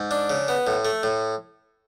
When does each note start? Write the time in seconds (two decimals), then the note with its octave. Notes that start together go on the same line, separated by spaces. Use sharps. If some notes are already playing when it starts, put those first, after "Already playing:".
Already playing: G#2
0.11 D4
0.30 C#3
0.48 B3
0.67 A2
0.85 A3
1.03 A2